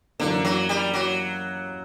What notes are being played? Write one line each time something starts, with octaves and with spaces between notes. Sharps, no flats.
F#2 D3 E3 A#3
F#3
G3
F#3